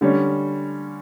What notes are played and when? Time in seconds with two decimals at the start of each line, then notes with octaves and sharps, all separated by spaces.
0.01 D3 G3 C#4